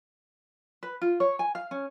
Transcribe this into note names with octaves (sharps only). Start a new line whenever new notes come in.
B4
F4
C#5
G#5
F5
C#4